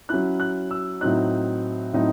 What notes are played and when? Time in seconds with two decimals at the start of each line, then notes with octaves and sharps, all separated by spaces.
0.09 F#3 C#4 E4 F#6
0.40 F#6
0.71 E6
1.01 A2 F#3 C4 D#4 F#6
1.93 A2 F#3 C4 D#4